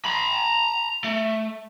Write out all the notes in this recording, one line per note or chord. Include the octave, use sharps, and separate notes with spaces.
A#5 B5
A3